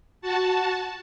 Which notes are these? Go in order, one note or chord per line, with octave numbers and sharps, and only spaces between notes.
F#4 A5